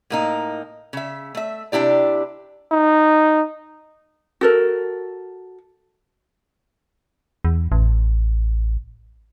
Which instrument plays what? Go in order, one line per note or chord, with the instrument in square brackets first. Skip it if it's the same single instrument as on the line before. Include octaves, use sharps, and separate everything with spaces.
[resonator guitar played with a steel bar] A2 A#3 D#4
C#3 E5
A3 E5
C3 D4 E4 G4 D5
[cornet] D#4
[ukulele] F#4 A4 A#4
[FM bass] E2
A1